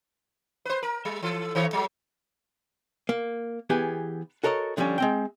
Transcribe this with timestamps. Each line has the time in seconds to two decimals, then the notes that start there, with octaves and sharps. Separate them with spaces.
0.65 B4 C5
0.83 A#4
1.05 G3
1.23 E3 A4
1.55 D#3 E3 C#5
1.73 F#3 G3
3.09 A#3
3.70 E3 B3 G4 G#4
4.44 F#4 A4 A#4 C#5 D#5
4.77 D3 F3 G3 C4 C#4
4.98 G#3 C4 G5